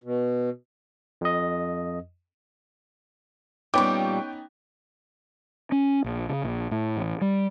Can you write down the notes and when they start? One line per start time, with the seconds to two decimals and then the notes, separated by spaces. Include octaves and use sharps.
0.04 B2
1.21 F2 D#5
3.74 A#2 G3 B3 C#4 D#4 G5 C#6 D6
5.72 C#4
6.04 A#1
6.29 C#3
6.44 A#1
6.71 A2
6.97 A1
7.21 G3